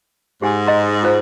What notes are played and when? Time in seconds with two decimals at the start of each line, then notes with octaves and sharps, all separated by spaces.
0.42 G#2 G4 G#5
0.67 D#5 A#5 C6
1.03 F4 C5 A#5